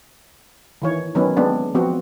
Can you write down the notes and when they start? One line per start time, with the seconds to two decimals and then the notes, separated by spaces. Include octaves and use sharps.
0.82 D#3 E3 C#5
1.15 D#3 F#3 B3 C#4 B4
1.37 G#3 B3 C4 D4
1.75 F3 B3 C4 F#4